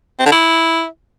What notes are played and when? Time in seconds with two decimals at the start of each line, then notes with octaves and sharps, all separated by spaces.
0.19 C4
0.26 D3
0.32 E4